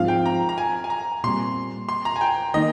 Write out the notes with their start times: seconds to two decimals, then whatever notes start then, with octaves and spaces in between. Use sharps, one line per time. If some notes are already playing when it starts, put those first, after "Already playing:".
Already playing: G#2 F3 C4 F4 F5
0.08 G5
0.26 A#5
0.49 A#5
0.58 G#5
0.84 G#5
0.90 A#5
1.23 A#2 G3 C4 C6
1.89 C6
2.05 A#5
2.16 G#5
2.21 G5
2.54 D#3 A#3 D#4 D#5